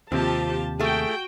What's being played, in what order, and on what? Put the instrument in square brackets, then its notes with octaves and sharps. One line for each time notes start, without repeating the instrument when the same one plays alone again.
[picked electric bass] D#2 C3 [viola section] F3 G4 A5 [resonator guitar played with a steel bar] C4
[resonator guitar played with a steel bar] A3 G#4 [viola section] F#4 G5